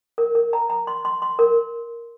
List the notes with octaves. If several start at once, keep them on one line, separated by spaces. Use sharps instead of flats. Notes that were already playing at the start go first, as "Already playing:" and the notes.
A#4
A#4
A#5
A#5
C6
C6
C6
A#4